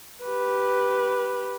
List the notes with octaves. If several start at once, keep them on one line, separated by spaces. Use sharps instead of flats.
G4 B4